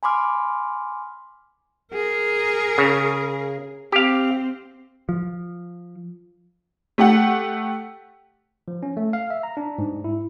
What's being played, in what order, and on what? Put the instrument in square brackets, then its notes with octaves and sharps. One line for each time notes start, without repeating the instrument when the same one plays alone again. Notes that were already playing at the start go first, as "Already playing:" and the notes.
[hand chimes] G#5 B5 C6 D6 F6
[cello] G#4 A#4
[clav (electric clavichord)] C#3
[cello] C4 [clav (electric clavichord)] G4 F5
[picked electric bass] F3
[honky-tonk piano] A3 G4 F#5
[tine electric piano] F3
C#4
A3
F5
E5
A#5
D4
G#2
E4